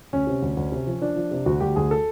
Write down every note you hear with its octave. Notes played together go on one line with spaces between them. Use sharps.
D2 C#4
C3
D2
D2
C3
F3
F3 D4
F3
C3
D2 F#4
D2 G4
D2 G#4
A4